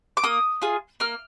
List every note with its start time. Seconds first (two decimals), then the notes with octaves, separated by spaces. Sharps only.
0.17 D6
0.24 A#3 D#6
0.62 F4 G#4
1.00 A#3 F6